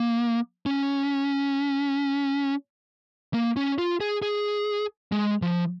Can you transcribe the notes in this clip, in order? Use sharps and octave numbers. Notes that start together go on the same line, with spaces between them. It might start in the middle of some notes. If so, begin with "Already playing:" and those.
Already playing: A#3
C#4
A#3
C#4
F4
G#4
G#4
G#3
F3